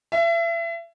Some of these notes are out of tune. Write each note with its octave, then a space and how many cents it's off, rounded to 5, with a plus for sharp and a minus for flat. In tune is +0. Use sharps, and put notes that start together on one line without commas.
E5 +35